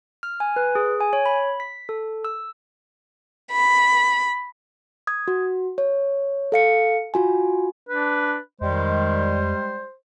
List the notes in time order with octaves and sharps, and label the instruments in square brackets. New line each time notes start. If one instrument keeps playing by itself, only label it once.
[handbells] F6
G#5
B4
G#4
G#5
C#5
B5
B6
A4
E6
[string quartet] B5
[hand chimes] D#6 G#6
F#4
C#5
A4 F5 C#7
F4 F#4 G#5
[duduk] D4 [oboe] B4
[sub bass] F2 [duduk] D#3 [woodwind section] G3 G#3 [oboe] C5